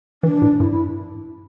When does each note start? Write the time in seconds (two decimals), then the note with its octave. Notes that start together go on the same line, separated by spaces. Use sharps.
0.23 E3 D4
0.42 A2
0.59 G2 E4
0.71 E4